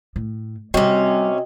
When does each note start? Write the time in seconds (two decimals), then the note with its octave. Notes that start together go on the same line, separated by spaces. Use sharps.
0.16 A2
0.74 C3 G3 C4 C#4 F#4 D#5 G5